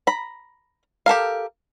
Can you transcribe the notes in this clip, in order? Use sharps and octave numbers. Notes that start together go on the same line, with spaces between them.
A#5 B5
G4 A4 A#4 F5